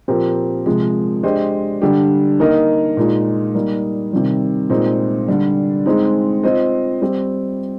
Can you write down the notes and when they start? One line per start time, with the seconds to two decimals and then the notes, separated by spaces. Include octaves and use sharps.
0.08 A#2 F3 C4 G4 A#4
0.66 C3 F3 G#3
1.23 G#3 D4 G4 C5 D#5
1.82 D3 G3 D4 G4
2.40 A#3 D#4 A#4 D#5
2.97 A#2 G#3 D#4
3.55 G3 A#3 D#4
4.13 C3 D#3 G3
4.70 A#2 G#3 C4 D#4
5.28 D3 G3 D4
5.86 G#3 C4 D#4
6.43 C4 F4 C5 D#5
7.02 G3 C4 G4